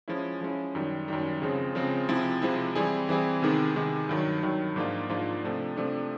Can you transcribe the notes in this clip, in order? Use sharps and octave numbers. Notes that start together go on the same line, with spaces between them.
F3 G#3 C#4 E4
F3 G#3 C#4 E4
F#2 D#3 G3
F#2 D#3 G3
C#3 F3 G#3 C4
C#3 F3 G#3 C4
C3 F3 G#3 C4 E4
C3 F3 G#3 C4 E4
E3 G3 C4 E4 G#4
E3 G3 C4 E4 G#4
C3 D#3 G#3 B3
C3 D#3 G#3 B3
G2 D#3 F#3
G2 D#3 F#3
G#2 F3 A#3 D4 F4
G#2 F3 A#3 D4 F4
C3 F3 A3 D4
C3 F3 A3 D4